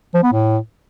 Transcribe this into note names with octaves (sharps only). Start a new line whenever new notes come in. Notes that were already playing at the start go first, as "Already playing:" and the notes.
F3
B3
A2